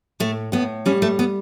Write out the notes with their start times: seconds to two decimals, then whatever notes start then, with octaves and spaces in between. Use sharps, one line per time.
0.20 A2 A3
0.52 A2 B3
0.86 G3 C#4
1.02 A3
1.19 B3